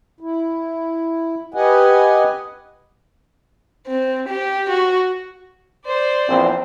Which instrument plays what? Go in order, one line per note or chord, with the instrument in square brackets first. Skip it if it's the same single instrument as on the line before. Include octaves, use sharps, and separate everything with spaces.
[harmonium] E4
G4 B4 D#5 F#5 G#5
[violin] C4
G4
F#4
[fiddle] C5 D5
[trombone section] A#1 E2 C4